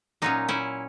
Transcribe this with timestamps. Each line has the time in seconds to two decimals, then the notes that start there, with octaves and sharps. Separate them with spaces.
0.22 A#2 F#3 C#4 D#4
0.49 C#4 E4